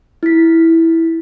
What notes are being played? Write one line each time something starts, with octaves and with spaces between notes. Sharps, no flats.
E4 B6